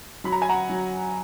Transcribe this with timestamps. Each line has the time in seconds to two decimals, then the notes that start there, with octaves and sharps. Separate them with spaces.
0.24 F#3 B5
0.32 A#5
0.42 G#5
0.49 F#5 A#5
0.70 F#3